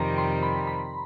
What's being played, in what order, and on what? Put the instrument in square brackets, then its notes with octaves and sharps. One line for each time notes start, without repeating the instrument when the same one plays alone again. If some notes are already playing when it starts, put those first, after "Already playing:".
Already playing: [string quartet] F2 C3 D#3 G3 C4 [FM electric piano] A#5 C6
[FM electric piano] C6
B5
B5